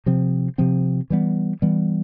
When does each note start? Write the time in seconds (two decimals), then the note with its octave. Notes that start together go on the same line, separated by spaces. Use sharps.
0.06 C3 F3 C4
0.58 C3 F3 C4
1.10 E3 G3 B3
1.62 E3 G3 B3